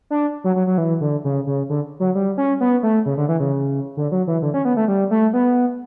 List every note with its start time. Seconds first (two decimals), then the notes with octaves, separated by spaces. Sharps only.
0.10 D4
0.44 F#3
0.56 F#3
0.67 F#3
0.78 E3
1.01 D3
1.24 C#3
1.47 C#3
1.70 D3
2.00 F#3
2.15 G3
2.37 C#4
2.60 B3
2.83 A3
3.06 C#3
3.17 D3
3.29 E3
3.40 C#3
3.97 D3
4.12 F#3
4.27 E3
4.42 D3
4.54 C#4
4.65 B3
4.77 A3
4.88 G3
5.11 A3
5.33 B3